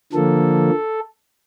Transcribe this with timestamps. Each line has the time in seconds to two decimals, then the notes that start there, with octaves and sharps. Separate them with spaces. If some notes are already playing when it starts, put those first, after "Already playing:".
0.13 D3 F3 A#3 A4